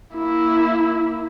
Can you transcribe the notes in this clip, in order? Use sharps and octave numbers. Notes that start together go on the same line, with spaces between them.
A#3 E4